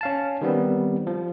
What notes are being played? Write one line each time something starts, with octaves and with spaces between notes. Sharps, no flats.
C#4 F5 A5
D#3 G3 B3 C4
F3